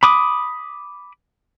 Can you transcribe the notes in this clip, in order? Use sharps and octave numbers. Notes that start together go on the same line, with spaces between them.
B5 D6 D#6